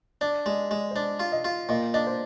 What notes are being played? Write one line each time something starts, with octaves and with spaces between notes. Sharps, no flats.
D4 D5
G#3 D5
G#3 D5
C5
D4 D5
F4
D#5
F4
A#2 D#5
D4 D#5
C5